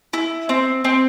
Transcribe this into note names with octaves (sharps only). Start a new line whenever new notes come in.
E4
C4
C4